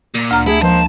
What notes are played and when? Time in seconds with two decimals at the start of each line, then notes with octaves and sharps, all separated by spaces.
0.15 A#2
0.31 D2 A#5 F6
0.46 A3 E4 G4 G#4
0.62 F3 G#3 A#3 C5 A5